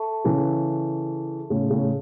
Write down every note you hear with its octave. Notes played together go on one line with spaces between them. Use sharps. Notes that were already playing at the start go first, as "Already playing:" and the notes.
Already playing: A4 E5 A5 C#6
C#3 E3
A2 C#3
A2 C#3